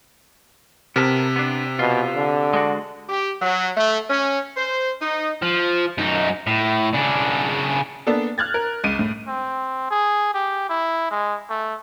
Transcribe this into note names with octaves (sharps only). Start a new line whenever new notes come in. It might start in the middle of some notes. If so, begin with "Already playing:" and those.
C3 B3 A#4 A5
B3 D4
B2 F4
D3
G#3 D4 F#4
G4
F#3
A3
C#4
C5
D#4
F3
F#2 D#4
A2
C#3 D4
A#3 B3 D4 A4
F6 F#6 G#6 A6
A#4
C#2 D7 D#7
A2
C4
G#4
G4
E4
G#3
A3